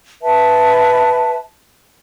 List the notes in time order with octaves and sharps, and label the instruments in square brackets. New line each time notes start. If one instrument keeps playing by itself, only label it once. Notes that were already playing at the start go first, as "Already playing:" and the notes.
[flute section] B4 E5 A5